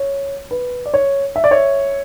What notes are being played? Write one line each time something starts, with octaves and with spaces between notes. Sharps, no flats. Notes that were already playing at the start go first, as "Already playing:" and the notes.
Already playing: C#5
B4
D5
C#5
E5
D5
C#5 E5